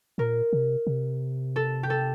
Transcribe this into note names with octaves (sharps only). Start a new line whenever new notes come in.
A#2 A#4
C3
C3
A4
G4
A4